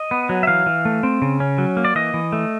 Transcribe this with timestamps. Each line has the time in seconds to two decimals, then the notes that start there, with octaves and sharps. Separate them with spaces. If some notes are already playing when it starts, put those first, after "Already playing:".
Already playing: D#5
0.11 B3
0.29 F#3
0.43 E5
0.47 E3 F5
0.66 E3
0.85 A3
1.03 C4
1.22 C#3
1.40 C#4
1.58 F#3
1.77 A#3
1.85 D5
1.95 E3 D#5
2.14 E3
2.32 A3